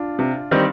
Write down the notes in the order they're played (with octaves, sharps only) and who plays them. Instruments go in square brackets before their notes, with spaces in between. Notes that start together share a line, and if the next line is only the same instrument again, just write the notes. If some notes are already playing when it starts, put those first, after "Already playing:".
Already playing: [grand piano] D4 F4
[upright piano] C3
D#3 G3 C4 D#4